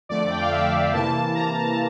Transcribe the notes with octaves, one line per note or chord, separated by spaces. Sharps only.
F2 D3 A3 D5
G5
F5
E5
C3 E3 A#3 A5
A#5